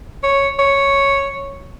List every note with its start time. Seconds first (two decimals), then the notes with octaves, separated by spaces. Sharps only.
0.23 C#5
0.59 C#5